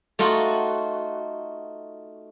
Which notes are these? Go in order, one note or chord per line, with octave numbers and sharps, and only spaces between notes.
A3 D#4 F4 F#4